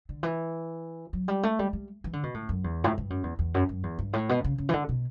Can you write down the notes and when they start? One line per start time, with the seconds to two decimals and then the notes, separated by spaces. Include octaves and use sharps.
0.09 D3
0.23 E3
1.13 F#3
1.28 G3
1.43 A3
1.59 G3
1.73 G3
2.04 E3
2.13 D3
2.23 B2
2.34 A2
2.49 F#2
2.64 E2
2.84 A2
2.98 G2
3.10 F#2
3.23 E2
3.39 E2
3.54 F#2
3.69 F#2
3.83 E2
3.99 G2
4.13 A2
4.29 B2
4.44 C#3
4.58 C#3
4.69 E3
4.73 D3
4.89 B2